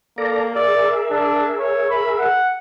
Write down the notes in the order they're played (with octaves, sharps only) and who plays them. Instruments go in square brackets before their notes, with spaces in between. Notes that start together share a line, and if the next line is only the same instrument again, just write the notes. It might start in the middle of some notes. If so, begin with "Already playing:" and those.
[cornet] A#3 [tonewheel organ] A4 D5 A#5
[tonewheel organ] G#4 A#4 E5 [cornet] D5
[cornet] D4
C#5
B5
F#5